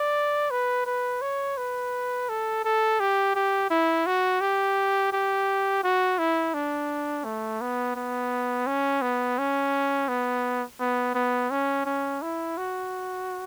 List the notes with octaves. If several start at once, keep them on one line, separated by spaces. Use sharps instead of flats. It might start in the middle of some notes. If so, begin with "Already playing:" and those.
Already playing: D5
B4
B4
C#5
B4
A4
A4
G4
G4
E4
F#4
G4
G4
F#4
E4
D4
A3
B3
B3
C#4
B3
C#4
B3
B3
B3
C#4
C#4
E4
F#4